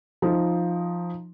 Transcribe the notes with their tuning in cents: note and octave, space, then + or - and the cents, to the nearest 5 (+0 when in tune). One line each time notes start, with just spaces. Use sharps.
F3 +0 D#4 +0